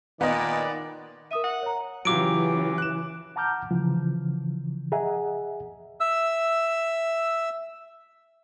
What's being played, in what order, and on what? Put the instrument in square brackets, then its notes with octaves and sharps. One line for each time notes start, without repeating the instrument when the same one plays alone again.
[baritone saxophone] A#2 [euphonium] D#3 [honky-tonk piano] B3 D#5 [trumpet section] D5
[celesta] A#4 D#6 D#7 [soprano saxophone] E5
[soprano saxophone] F#5
[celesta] C#5 A#5
[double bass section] C#3 E3 [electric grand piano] F#3 F4 G4 [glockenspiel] D6 D7
[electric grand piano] F#6 E7
[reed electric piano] F#5 A5 A#5 D6 F6 G6
C#3 E3 F3
G#4 D#5 E5 F#5 G#5 A#5
[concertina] E5 E6